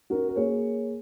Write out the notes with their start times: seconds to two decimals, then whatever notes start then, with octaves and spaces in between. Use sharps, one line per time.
0.10 C#4 F#4 A#4
0.28 A#4
0.36 A#3 G#4 C#5